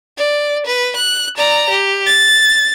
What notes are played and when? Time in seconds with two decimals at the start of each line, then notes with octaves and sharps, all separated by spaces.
0.18 D5
0.66 B4
0.96 F#6
1.37 D5 A#5
1.70 G4
2.06 A6